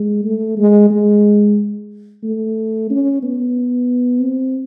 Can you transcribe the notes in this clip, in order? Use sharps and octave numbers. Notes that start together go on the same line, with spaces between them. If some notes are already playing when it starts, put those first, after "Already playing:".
Already playing: G#3
A3
G#3
G#3
A3
C#4
B3
C4